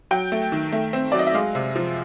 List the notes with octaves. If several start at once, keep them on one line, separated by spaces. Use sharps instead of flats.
F#3 G5
A3
D#3
A3
C4
F#3 D5
D#5
E5
G#3 F5
C3
F3